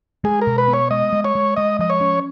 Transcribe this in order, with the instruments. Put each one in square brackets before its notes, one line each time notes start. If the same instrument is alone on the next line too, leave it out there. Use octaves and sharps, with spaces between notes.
[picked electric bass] G#3 [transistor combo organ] G#4
[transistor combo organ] A#4
[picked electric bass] B2
[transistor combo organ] B4
[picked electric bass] B3
[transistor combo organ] C#5
[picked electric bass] G#3 [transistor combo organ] D#5
[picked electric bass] G#3
[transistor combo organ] C#5
[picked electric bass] G#3
[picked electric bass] G#3 [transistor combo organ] D#5
[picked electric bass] F3 [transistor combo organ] D#5
[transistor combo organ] C#5
[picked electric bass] C#4